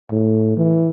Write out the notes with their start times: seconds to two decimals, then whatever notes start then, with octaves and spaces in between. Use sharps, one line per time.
0.11 A2
0.57 E3